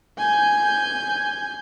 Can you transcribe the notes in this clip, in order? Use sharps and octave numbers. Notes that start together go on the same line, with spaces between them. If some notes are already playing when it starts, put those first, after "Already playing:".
G#5 G6